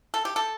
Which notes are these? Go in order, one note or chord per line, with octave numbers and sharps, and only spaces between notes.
A4
G4
A4